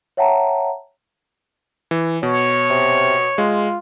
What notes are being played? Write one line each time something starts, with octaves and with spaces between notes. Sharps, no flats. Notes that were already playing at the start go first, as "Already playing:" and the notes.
C#5 E5 F#5 G5 A5 A#5
E3
B2 C#5
C3
G#3 F4